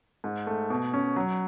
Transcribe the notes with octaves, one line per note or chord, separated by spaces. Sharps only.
G#2
A3
B2
C#4
F#3